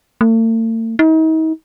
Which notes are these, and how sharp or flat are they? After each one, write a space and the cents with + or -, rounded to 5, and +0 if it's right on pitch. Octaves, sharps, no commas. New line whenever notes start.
A3 +45
D#4 +40